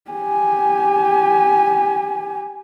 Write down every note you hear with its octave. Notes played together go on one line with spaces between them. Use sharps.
G4 G#5